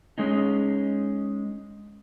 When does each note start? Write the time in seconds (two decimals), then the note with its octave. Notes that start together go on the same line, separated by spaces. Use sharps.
0.18 G#3 C#4 D#4